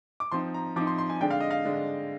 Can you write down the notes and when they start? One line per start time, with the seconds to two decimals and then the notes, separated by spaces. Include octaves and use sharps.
0.20 D6
0.32 F3 C4 D#4 C6
0.54 A#5
0.76 F3 C4 D#4 D6
0.87 C6
0.98 C6
1.10 G#5
1.21 D3 G#3 D4 G5
1.30 F5
1.40 D#5
1.51 F5
1.65 D3 G#3 D4